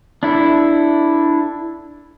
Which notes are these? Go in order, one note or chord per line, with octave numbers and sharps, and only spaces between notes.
D4 E4 A4